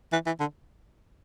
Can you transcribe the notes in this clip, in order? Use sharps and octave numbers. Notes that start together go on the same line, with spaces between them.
E3
E3
D3